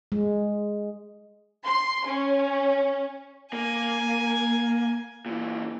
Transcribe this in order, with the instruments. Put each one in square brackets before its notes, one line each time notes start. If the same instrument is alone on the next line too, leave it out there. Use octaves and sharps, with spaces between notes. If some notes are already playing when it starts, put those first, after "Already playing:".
[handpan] G#3
[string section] C6
C#4
[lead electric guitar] A#3 [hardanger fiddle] G#5
[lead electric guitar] A#2 E3